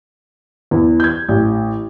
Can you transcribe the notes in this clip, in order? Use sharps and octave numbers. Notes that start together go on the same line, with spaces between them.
E2
G6 G#6
A1